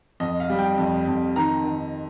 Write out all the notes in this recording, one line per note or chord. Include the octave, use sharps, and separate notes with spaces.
F2 D#5
F5
G3
G5
F2
F2
D#3 A#5
D#3